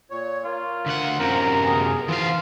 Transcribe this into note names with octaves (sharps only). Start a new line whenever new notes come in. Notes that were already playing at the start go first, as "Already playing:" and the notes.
A#2 C#5
A#3 F4
D2 F#5
F#2 C3 F4 A#4 C5
B3 G#4
G#2 E3 F4 F5